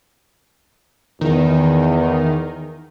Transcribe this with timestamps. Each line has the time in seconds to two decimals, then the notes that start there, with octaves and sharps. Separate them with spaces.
1.21 E2 D#3